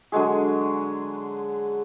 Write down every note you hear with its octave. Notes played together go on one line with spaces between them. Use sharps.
D3 F#3 G#3 G#4